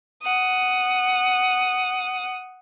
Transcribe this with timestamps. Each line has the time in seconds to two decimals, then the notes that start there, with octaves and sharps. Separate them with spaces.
0.23 F#5 D#6